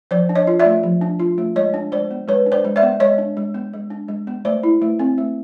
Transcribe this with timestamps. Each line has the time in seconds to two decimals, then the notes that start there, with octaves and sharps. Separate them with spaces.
0.11 F3 C5 D5
0.29 D4
0.36 C#5 D#5
0.47 F4
0.60 D5 E5
0.65 A3
0.83 F3
1.01 D4
1.19 F4
1.38 A3
1.56 G#3 C#5 D#5
1.74 D4
1.92 G#3 C5 D5
2.11 B3
2.28 G#3 B4 C#5
2.46 D4
2.52 C5 D5
2.65 G#3
2.76 D5 E5
2.82 B3
3.00 G#3 C#5 D#5
3.18 D4
3.37 G#3
3.55 B3
3.73 G#3
3.90 D4
4.08 G#3
4.27 B3
4.45 A3 C5 D5
4.63 E4
4.82 A3
4.99 C4
5.18 A3